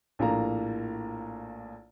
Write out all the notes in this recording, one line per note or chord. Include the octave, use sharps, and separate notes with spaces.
A#1 A2 A#3 A#5